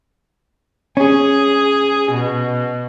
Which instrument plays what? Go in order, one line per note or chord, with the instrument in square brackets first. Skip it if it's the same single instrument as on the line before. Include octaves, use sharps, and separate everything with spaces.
[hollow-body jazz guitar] C#4 [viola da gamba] G#4
[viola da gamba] B2